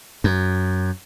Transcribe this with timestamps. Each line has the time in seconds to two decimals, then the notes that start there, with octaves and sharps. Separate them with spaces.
0.24 F#2